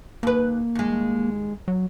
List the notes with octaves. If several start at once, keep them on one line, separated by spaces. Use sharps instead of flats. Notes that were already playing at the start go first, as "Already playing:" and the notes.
D#2 A#3 B4
D#2 G#3
F#3